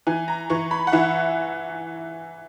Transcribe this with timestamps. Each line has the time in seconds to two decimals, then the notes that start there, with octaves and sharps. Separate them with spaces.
0.07 E3 G#5
0.28 A#5
0.50 E3 C#6
0.71 B5
0.87 F#5
0.92 E3 E5